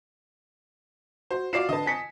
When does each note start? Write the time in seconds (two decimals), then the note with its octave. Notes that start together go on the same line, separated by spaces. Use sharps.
1.31 F#4 C5
1.53 F4 F#4 D5 C7 E7
1.69 D3 B4 D#5 A5
1.86 G#5 B6 C#7